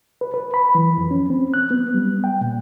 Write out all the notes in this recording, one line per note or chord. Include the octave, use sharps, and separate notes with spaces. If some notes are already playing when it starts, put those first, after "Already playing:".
B4
B4
B5
E3
F2
C#4
C4
F#6
B3
G3
G5
A#2